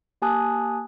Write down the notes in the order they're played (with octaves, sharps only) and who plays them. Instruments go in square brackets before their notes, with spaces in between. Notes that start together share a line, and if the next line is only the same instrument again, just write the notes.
[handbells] A#3 G4 G#5 A5 D#6 F#6